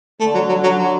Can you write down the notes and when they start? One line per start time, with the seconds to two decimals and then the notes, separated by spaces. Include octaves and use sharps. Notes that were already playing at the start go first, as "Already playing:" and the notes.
0.20 D3 A3
0.34 F#3
0.49 F#3
0.63 F#3
0.78 F#3